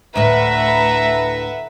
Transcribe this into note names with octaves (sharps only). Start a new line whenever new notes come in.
D2 A2 B4 E5 F#5 A#5